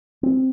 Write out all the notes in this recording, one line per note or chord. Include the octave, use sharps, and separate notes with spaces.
C4